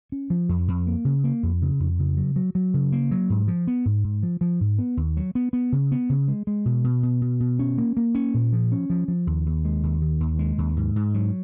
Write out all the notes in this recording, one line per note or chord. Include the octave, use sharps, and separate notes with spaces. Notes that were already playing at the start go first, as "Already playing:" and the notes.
C#4
F3
F2
F2
A#3
C#3
A#3
F2
C#3
F2
C#3
F#3
F#3
F#3
C#3
A#3
F#3
G#2
F3
B3
G#2
G#2
F3
F3
G#2
B3
D#2
F#3
B3
B3
C#3
B3
C#3
G#3
G#3
B2
B2
B2
B2
B2
C#4
A#3
A#3
C#4
A#2
F3
C#4
F3
F3
D#2
D#2
G#3
D#2
D#3
D#2
G#3
D#2
G#2
G#2
F#3